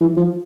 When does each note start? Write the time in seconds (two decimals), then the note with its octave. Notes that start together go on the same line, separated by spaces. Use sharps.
0.01 E3
0.17 F3